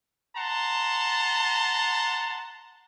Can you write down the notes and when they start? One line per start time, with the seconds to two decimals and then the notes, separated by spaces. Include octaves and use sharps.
0.37 F#5 A5 A#5 C6